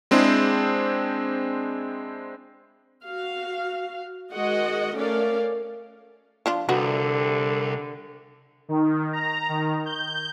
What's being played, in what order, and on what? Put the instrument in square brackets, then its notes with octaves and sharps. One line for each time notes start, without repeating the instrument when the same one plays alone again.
[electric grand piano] G#3 C4 D4 E4 G#4 C5
[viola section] F#4 F5
D#3 G#3 F#4 D#5 F#5
A3 C#4 A#4 D5 F5
[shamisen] F3 D4 F4
[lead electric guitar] C2 [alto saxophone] D3 [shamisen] F#4 B4
[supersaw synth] D#3
A#5
D#3
G6